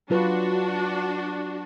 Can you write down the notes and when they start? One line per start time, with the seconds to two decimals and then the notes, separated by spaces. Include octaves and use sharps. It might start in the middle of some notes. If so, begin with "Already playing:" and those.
0.10 F#3 D4 F4 F#4 B4